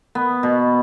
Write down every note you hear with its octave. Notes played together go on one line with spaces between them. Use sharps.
B3
B2